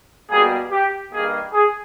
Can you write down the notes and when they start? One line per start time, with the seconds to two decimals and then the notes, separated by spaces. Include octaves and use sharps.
0.30 B2 G3 A#3 G#4
0.71 G4
1.11 G2 D#3 G3 A#3 D#4 G#4
1.53 G#4